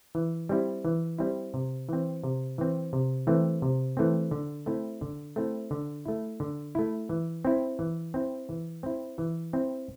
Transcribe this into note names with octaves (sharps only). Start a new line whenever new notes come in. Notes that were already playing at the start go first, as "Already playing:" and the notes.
E3
G3 C4 E4
E3
G3 C4 E4
C3
E3 C4
C3
E3 C4
C3
E3 A3 C4
C3
E3 A3 C4
D3
A3 C4 E4
D3
A3 C4 E4
D3
A3 E4
D3
A3 E4
E3
C4 E4
E3
C4 E4
E3
C4 E4
E3
C4 E4